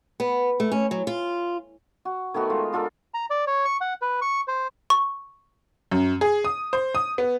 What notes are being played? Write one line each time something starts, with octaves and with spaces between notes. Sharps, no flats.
B3
A3
C#4
F#3
F4
F#4
D#3 A3 B3 F#4
G#3 F4
D4 F4 A4 A#4
A#5
D5
C#5
C#6
F#5
B4
C#6
C5
C#6
F#2
G#4
D#6
C5
D#6
B3